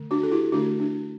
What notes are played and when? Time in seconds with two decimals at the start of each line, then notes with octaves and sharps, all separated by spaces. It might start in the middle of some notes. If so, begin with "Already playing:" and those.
Already playing: D3 A3
0.11 D4 F#4
0.23 A4
0.31 E4 G4
0.52 D3 A3 D4 F#4
0.80 D4